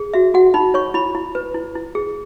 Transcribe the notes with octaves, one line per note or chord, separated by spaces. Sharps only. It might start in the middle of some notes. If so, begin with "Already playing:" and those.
Already playing: G#4
F#4 E5
F#4 F#5
D#4 B5
C#5 C#6
E4 B5
E4
B4
E4
E4
G#4